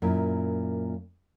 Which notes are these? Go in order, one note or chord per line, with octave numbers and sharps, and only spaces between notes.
F#2 A#2 E4